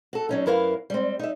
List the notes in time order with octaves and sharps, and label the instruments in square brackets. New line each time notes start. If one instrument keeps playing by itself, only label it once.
[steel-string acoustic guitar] F#4 A4
F#3 C#4 D#4
F#2 E4 A#4 B4 F5
G3 G#3 C4
D#4 E5